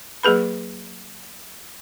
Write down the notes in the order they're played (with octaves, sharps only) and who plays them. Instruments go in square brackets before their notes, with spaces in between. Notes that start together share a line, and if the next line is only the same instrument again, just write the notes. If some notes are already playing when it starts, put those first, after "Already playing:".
[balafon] F#3 A#3 G#4 B4 B5